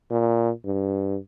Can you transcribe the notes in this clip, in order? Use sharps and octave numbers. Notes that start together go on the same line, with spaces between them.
A#2
G2